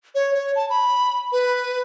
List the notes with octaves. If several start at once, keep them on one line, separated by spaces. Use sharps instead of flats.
C#5
C#5
A5
B5
B4